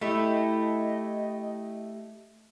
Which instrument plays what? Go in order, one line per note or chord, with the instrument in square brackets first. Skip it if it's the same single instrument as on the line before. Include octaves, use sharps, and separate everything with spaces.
[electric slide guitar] A3 [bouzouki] E4 G4 A4 [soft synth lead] D#5